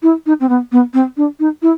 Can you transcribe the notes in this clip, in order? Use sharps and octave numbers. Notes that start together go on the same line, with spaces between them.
E4
D#4
C4
B3
B3
C4
D4
D#4
E4